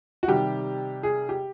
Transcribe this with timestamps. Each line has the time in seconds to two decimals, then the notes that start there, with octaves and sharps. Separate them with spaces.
0.23 F#4
0.28 C3 D#3 G3 G4
1.03 G#4
1.29 G4